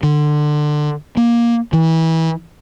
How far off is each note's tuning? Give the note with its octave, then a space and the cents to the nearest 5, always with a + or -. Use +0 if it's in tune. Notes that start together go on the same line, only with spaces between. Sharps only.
D3 +25
A#3 +15
E3 -25